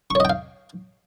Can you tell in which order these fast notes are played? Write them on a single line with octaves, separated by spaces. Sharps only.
C#6 C#5 D#5 G5 F5